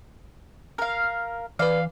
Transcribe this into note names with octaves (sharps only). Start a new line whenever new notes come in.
A#4 F5
E3 B4 D5 F5